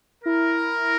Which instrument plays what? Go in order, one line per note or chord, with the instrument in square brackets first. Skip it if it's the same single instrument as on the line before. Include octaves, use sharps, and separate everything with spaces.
[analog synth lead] E4 [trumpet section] A#4